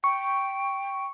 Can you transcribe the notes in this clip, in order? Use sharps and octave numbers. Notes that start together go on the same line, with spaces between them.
G5 C#6